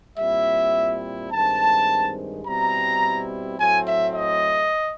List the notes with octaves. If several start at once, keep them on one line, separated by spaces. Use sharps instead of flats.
A#2 G3 C4 E4 E5
G2 D#3 G#3 C4 A5
B2 G3 C4 E4 A#5
A2 F#3 A3 C4 G#5
E5
D#5